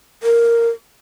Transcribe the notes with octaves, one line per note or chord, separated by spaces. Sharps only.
A#4